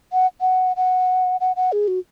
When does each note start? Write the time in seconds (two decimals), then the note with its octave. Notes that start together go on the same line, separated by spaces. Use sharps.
0.13 F#5
0.41 F#5
0.76 F#5
1.41 F#5
1.56 F#5
1.72 G#4
1.88 F#4